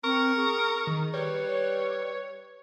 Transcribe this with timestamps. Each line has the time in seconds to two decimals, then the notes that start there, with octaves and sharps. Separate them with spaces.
0.04 C4 A#4 C#6
0.36 G#4
0.87 D#3
1.14 G3 B4 C#5